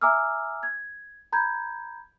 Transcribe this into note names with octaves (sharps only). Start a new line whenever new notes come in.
E5 G#5 A#5 D6 E6 F6
G#6
A#5 B5 G6 G#6